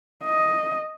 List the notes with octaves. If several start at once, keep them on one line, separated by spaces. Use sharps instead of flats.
D#5